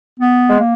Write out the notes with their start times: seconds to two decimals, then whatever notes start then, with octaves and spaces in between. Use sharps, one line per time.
0.20 B3
0.48 G#3
0.59 A#3